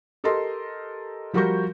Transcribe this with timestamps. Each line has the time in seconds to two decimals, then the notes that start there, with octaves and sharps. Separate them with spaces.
0.24 G4 A4 A#4 D#5 C6
1.33 F3 G3 F#4 A#4 C#6 G6